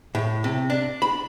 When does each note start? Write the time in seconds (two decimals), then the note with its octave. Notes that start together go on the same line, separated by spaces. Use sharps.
0.15 A2
0.44 C3
0.70 D4
1.02 B5